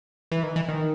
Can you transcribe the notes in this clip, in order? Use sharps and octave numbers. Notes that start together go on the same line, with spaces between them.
E3
D#3
E3
D#3